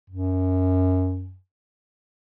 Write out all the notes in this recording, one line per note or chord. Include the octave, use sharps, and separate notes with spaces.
F#2